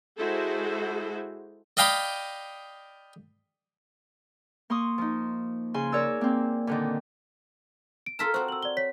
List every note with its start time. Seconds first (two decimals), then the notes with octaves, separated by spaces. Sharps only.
0.17 G#3 E4 F#4 G#4 A4 C5
1.77 D5 D#5 F5 G5 B5 D#6
4.70 A#3 C6 C#6 D#6
4.98 F3 D#4
5.74 C#3 G#5 C6
5.92 A#4 C#5 D5 E6
6.21 A#3 C4
6.67 A#2 D3 D#3
8.06 D7
8.19 F4 A4 A#4 F6 B6 E7
8.34 C4 F#4 C5
8.48 E6 F#7
8.63 D5 G7
8.77 C#5 B6